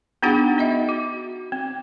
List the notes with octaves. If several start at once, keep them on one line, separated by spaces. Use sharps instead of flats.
B3 D4 D#4 F#4 G#4 F#5
B3 D#4 D#5 E5
F#4
C4